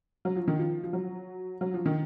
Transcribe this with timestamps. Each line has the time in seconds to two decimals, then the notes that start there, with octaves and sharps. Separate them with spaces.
0.25 F#3
0.36 F3
0.48 D#3
0.59 F3
0.84 F3
0.93 F#3
1.61 F#3
1.74 F3
1.86 D#3